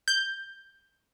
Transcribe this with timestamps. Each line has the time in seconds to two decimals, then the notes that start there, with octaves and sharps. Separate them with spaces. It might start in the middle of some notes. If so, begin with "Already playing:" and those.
0.08 G6